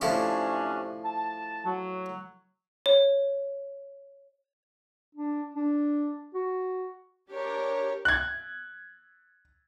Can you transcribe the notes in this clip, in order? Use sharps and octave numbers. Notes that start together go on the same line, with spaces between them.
A2 C3 F3 C#4 D4 G4
A5
F#3
C#5
D4
D4
F#4
D4 G4 A#4 C#5
F#6 G#6